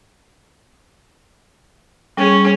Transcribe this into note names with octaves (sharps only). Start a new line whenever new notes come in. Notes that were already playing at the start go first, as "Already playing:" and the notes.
G3 C#4 G#4